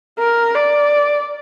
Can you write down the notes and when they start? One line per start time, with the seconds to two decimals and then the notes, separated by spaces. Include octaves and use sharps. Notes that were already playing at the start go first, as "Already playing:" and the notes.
0.19 A#4
0.55 D5